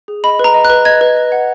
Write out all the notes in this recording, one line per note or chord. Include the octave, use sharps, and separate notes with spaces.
G#4
D#5 B5
B4 A#5
D#5
F#6
B4
D#5 G#6
B4
D#5
F#5